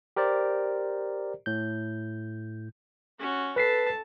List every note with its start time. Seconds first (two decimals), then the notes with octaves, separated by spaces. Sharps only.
0.16 G4 A#4 C5 D5
1.46 A2 G6
3.20 C#4 F#4
3.56 A4 B4 A5 B6 C7